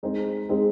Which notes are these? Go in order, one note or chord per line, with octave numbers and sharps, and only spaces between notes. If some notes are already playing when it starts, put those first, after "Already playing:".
G#3 C4 D#4 G#4 C5
G#3 C4 D#4 G#4 C5